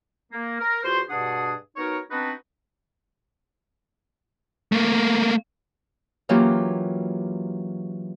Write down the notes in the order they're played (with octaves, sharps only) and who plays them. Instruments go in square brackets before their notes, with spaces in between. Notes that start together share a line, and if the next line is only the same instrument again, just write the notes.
[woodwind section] A#3
A#4
E2 F4 F#4 C5
G2 B2 D4 G#4 F#5 D#6
B3 D#4 F#4 A#4 C#5
B3 C4 D4 D#4 F#4 B4
[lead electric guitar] A3 A#3
[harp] E3 F#3 A#3 C#4 F4 G4